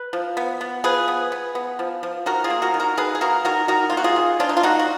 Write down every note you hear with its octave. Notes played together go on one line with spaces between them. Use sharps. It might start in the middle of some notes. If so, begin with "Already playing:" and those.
Already playing: B4
F3
B3
B3
F3 G#4 B4
B3
B3
B3
F3
F3
D#3 F#4 A#4
F4 G#4
A#3
F#4 A#4
D#3
F#4 A#4
D#3 G#4 B4
G#4
A#3 F#4 A#4
D#3 F#4 A#4
D#3 F#4 A#4
A#3 F4
F#4
F4 G#4
D#3
D#3 D4 F4
D#4
F4
A#3 D#4 F#4
F#4